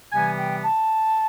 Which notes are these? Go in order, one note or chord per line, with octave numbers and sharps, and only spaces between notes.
C3 E3 G3 B3 G#5
G5
A5